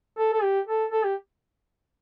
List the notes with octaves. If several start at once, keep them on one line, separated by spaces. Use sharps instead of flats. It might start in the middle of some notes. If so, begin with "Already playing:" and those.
A4
A4
G4
A4
A4
G4